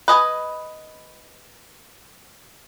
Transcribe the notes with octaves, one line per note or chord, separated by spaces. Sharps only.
B4 D#5 G#5